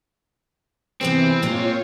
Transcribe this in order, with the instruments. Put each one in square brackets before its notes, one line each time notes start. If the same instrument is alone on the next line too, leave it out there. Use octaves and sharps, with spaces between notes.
[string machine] C3 E3 [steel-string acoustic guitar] B3 G#4 B4 [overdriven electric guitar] C4
[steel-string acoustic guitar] A#2 G#3 A#3 [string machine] F4 C#5